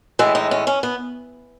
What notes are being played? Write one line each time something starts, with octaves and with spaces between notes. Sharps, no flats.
A2 E3 G#3 E4
D#4
C#4
C#4
B3